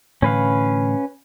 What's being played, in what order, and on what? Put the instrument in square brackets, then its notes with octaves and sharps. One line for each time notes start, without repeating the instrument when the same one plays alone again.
[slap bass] A2 D3 E3 [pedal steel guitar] C#4 B4 F5